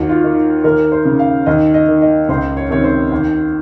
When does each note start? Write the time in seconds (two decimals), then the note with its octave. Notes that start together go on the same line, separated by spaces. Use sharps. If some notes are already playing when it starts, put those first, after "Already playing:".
Already playing: D#2 F#4
0.09 F4
0.24 D#3
0.64 D#2 A#4
0.92 C5
1.05 C#3
1.19 F5
1.46 D#2 D#5
1.74 D#5
1.88 D#3
2.02 D#5
2.29 C#2 C5
2.57 C#5
2.70 C3 D#3 C#5
2.84 C5
3.12 D#2